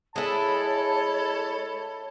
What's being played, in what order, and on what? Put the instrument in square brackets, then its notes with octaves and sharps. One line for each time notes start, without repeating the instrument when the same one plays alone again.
[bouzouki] G#3 E4 [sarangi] A4 [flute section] C#5 B5 [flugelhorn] A5